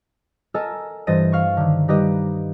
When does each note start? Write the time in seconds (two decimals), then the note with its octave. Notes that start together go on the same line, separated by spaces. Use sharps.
0.54 A4 A#4 D#5 G#5 E6
1.07 G2 E3 C5 D#5 A6 D#7
1.32 F5 C#6
1.57 D3 D#3
1.88 G3 D#4 G4 B4 D#5